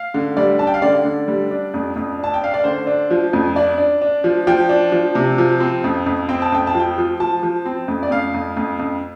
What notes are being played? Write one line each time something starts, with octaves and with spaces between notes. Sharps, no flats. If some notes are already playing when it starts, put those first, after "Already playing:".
Already playing: F5
D3
G3 D5
D4 A5
G5
F5
D3 D5
D3
G3
D4
F2
F2
D4 A5
G5
D4 F5
D5
D3 C5
D4
F3
F2
D4 D5
D4
D4
F3
F3 G5
D4
F3
C3
F3
C4
F2
F2
C4 G5
A5
F2 G5
A5
F3
G5
F3
F3 A5
F3
C4
F2
D5
F2 F5
F2
F2
F2